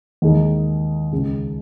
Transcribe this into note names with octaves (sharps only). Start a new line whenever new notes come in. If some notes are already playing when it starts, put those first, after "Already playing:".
D#2 D#3 G#3 D#4 G#4
C#2 C#3 G#3